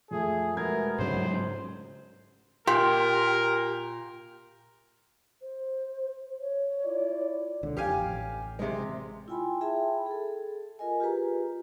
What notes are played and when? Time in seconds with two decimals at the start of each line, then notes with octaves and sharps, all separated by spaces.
0.11 F2 A3 G#4
0.57 E1 A3 B3 A#4 G#6
0.99 G#2 C#3 F#3 C5
2.67 A#2 G4 A#4 C6
5.42 C5
6.40 C#5
6.85 E4 F4 D5
7.63 E1 C#2 D3
7.77 F2 G4 F5 G#5
7.97 A1
8.59 C3 G#3
9.28 E4 F4 G5 G#5 B5 C6
9.61 G#4 E5 G5 A5 B5
10.06 G#4 A4
10.79 F4 A#4 D#5 G#5
11.00 F4 G4 G#4 B4 A#5